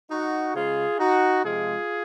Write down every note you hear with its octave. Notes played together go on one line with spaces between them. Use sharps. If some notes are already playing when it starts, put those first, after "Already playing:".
D#4 F#4
C#3 G#3 F4 G#4
D#4 F#4
C3 F3 G#3 F4 G#4